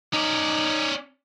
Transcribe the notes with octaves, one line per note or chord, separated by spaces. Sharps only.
C#4 D#4 D5